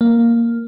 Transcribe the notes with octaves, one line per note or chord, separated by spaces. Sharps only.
A#3